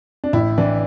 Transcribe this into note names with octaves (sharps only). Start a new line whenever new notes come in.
D4
A1 E4
E3 D4